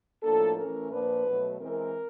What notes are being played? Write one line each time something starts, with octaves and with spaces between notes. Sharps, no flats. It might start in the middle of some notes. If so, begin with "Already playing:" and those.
A2 F3 A#3 D4 A4
E3 A3 C#4 A#4
A#2 F3 A#3 D4 B4
B2 F#3 A3
E3 G#3 C4 A#4